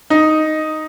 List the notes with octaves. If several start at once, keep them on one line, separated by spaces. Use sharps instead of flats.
D#4